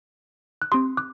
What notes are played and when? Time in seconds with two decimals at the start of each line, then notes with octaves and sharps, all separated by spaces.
0.62 F#6
0.72 C4 G4 C6 D#6
0.97 D6 F#6